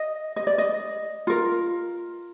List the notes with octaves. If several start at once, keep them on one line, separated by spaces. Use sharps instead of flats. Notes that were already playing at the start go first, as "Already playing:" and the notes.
Already playing: D#5
D#5
D5
D#5
F4 A#4